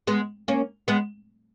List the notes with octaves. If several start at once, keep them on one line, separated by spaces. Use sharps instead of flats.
G#3 B3
A#3 C#4
G#3 B3